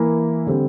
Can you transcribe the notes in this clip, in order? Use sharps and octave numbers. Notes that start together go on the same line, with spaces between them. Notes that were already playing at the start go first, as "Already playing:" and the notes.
Already playing: E3 A#3 E4 A#4
D3 G3 C4